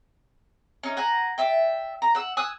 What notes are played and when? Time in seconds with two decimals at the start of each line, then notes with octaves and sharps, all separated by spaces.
0.83 C#4 D#4
0.97 F#5 G#5 A#5
1.38 D5 E5 G5
2.02 A#5
2.15 F#5 E6
2.37 G#5 D#6 E6 F#6